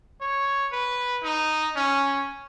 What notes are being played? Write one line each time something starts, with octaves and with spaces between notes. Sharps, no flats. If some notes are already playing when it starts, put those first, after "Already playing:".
C#5
B4
D#4
C#4